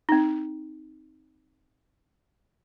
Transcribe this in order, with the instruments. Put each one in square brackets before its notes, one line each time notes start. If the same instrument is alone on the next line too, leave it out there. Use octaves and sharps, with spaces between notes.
[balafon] C4 D#4